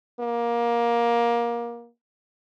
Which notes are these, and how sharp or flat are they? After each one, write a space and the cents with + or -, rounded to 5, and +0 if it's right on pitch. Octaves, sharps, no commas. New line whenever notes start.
A#3 +20